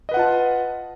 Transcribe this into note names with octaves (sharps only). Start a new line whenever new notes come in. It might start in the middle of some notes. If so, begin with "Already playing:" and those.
F4 B4 D#5 F#5 A5